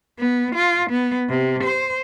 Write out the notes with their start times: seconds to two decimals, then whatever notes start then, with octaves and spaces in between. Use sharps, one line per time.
0.19 B3
0.55 F4
0.90 B3
1.30 C3
1.64 C5